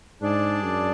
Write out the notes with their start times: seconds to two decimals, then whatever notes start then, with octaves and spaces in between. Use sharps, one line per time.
0.21 G#2 D4 G#4 D5 A5
0.64 F#2